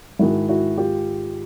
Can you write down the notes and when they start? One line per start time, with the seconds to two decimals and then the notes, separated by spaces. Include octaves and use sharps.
0.19 G#2 D#3 G#3 E4 F#4
0.49 E4 F#4
0.78 F4 G4